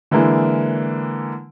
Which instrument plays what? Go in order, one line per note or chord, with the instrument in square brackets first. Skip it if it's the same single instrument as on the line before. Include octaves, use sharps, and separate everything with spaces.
[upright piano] D3 E3 G#3 A#3 E4